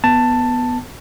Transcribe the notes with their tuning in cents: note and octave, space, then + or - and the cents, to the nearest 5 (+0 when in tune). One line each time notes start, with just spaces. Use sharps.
B3 +0 A5 +10